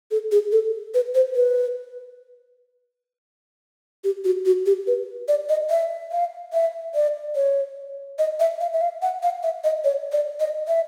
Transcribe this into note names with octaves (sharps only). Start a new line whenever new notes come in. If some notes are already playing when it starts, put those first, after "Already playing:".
A4
G#4
A4
B4
C5
B4
G4
F#4
F#4
G4
B4
D5
D#5
E5
F5
E5
D5
C#5
D#5
E5
F5
E5
F5
F#5
F5
E5
D#5
C#5
D5
D#5
E5